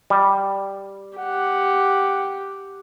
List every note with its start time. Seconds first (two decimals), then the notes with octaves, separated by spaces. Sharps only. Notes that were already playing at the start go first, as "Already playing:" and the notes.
0.10 G3
1.18 G4 F#5